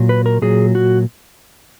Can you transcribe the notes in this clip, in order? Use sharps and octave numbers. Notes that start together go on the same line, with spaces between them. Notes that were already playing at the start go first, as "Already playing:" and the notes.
Already playing: A#2 F#3
B4
A#4
A#2 F#3 G#4
F#4